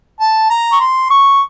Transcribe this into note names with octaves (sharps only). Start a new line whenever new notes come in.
A5
A#5
C#6
C6
C#6